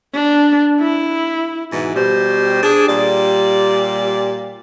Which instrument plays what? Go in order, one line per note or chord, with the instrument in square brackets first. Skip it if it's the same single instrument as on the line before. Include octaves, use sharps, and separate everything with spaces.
[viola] D4
E4
[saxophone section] G#2 B2 E3
B2 G3 G4 C5
D4 G#4
A#2 G3 G4 D5